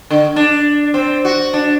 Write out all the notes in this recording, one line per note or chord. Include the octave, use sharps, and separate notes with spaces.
D3
D4
C4
F#4
D4